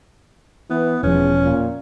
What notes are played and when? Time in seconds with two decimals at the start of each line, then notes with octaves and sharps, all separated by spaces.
0.70 E3 B3
1.03 E1 E2 F3 C#4
1.43 A#2